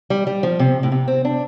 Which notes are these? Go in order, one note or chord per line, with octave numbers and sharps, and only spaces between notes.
G3
G3
F3
C3
A2
C3
C4
D4